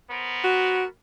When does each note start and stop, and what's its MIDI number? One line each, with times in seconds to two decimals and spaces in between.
0.11 0.86 59
0.11 0.86 70
0.11 0.86 72
0.44 0.85 66